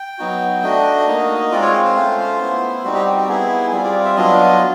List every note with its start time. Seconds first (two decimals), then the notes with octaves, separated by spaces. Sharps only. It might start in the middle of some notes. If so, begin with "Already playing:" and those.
Already playing: G5
0.18 F#3 B3 D#4 F#4
0.63 A3 D4 F#4 D#5
1.08 A#3 D#4 F#4
1.52 G#3 C4 F4 D5
1.62 C#5
1.73 C5
1.84 C5
1.96 A3 C#4 F4
2.40 B3 E4
2.84 G3 C4 D#4 F#4
2.95 G4
3.06 F#4
3.17 G4
3.29 B3 E4 G#4
3.72 G3 C4 F4 G#4
3.84 D5
4.05 E5
4.16 F#3 B3 D4 F4 D#5